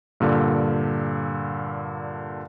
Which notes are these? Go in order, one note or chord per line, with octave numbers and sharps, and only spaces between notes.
G2 A#2 D3